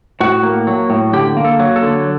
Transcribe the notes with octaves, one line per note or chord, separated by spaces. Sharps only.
A2 F#4
A#3
F#3
A2
D3 G4
A#3
A4
F#3
A4
D3